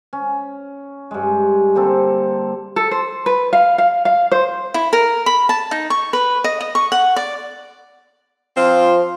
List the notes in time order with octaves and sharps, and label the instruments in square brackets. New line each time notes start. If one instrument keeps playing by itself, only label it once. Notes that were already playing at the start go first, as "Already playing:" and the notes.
[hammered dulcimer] C#4
G2 G#3
D3 A#3 C4 A4
[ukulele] A4
C5
B4
F5
F5
F5
C5
[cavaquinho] E4
A#4
B5
A5
D#4
C#6
B4
D#5
D#5
C#6
F#5
D5
[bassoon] F3 [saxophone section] C4 F4